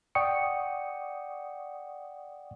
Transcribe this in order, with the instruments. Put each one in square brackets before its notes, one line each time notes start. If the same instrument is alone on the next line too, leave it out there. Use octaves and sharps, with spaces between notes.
[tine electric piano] D5 F#5 G5 C#6 D#6 C#7